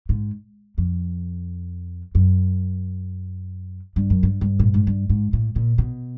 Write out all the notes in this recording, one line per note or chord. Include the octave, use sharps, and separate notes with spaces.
G#2
F2
F#2
G2
F#2
G2
G2
A2
G#2
G2
G#2
A2
A#2
B2